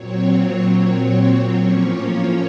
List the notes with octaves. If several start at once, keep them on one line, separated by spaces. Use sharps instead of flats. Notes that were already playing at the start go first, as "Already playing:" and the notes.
Already playing: A#2 F#3 C4 C#5
C#5
A2 F3 A#3 C#4